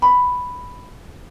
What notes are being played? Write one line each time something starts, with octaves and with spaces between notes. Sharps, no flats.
B5